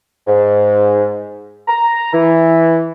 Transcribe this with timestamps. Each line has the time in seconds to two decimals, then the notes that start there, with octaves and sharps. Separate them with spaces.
0.27 G#2
1.68 A#5
2.13 E3